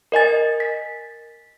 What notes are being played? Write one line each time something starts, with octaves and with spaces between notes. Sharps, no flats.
A#4 D#5 G#5 A6
B6